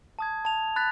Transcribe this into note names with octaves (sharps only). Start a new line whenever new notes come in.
A5 D#6 G#6
A5 F7
B5 F#6 A6 B6